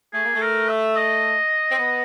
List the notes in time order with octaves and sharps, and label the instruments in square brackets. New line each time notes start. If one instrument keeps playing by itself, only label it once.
[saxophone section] A3 [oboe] G#4
[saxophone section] A#3
A3
[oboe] A#4
E5
D#5
[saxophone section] C4
B3